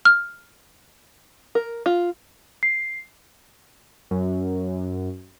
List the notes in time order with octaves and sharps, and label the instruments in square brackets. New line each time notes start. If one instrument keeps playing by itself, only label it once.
[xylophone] F6
[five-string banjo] A#4
F4
[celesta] C7
[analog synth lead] F#2